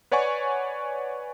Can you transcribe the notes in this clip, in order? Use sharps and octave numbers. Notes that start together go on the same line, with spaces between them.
B4 C#5 D5 F#5 G#5 C#6